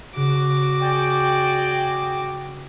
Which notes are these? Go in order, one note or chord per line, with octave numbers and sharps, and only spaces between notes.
C#3 F#4 D6 F#6
G#4 D5 G5